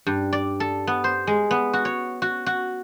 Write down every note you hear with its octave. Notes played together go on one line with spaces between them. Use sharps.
G2
D5
A4
B3
C5
G#3
B3
F#4
C#5
F#4
F#4